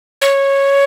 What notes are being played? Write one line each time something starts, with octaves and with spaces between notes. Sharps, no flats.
C#5